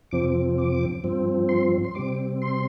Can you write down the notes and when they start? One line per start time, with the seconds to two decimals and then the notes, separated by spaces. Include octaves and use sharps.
0.11 F2 C3 F3 C4 D6
0.58 D6
1.04 G2 F3 C4
1.49 C6
1.84 C6
1.95 C3 G3 C4 D6
2.42 C6